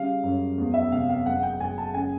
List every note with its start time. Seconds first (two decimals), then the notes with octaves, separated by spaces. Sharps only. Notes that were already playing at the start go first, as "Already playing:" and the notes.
Already playing: C#3 G3 F5
0.23 F#2
0.58 E2
0.74 E5
0.92 C3 F5
1.09 F5
1.26 F#1 F#5
1.43 G5
1.60 F#1 G#5
1.78 A5
1.94 C#3 G#5